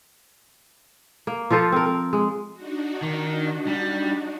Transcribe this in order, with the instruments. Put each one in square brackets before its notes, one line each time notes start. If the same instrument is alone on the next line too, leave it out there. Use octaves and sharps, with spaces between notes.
[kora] A#3
F3 F4 A4 C5
C4 A#4
A#4
G#3
[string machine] D4 D#4 F#4
[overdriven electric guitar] D#3
G3